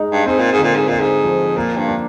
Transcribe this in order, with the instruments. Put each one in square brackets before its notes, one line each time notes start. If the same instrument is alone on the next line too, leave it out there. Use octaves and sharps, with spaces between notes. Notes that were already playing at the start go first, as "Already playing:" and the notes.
Already playing: [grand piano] G#3 D#4
[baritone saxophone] G2
[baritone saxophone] G#2 [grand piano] C4
[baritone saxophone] A#2
G#2
[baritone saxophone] A#2 [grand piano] D3
[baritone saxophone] G#2
[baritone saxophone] A#2 [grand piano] D#4
[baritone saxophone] G#2
[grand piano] F3
[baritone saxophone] A#2 [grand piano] A#3
[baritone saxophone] G2
[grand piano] D4